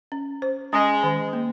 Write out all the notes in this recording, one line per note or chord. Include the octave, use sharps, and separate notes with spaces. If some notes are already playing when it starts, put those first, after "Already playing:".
C#4
C5
G#3 C#4
D#3
A#3